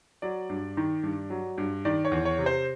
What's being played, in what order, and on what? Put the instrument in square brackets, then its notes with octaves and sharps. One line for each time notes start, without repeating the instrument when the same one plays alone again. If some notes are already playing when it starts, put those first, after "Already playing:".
[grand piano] F#3 D5
G2
D#3
G2
F#3
G2
D#3 D5
C#5
E2
C#5
C3
C5